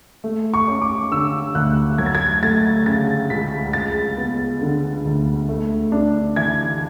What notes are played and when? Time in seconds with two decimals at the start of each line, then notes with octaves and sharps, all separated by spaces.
0.24 A3
0.54 C#6
0.68 C#4
0.82 D6
1.11 D3 E6
1.55 D2 F#6
1.98 F#3 G#6
2.06 A6
2.15 G#6
2.43 A3 A6
2.86 C#3 A6
3.30 C#2 B6
3.73 G#3 A6
4.17 B3
4.61 D3
5.05 D2
5.49 A3
5.92 D4
6.36 E3 G#6